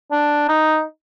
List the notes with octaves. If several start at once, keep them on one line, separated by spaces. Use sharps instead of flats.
D4
D#4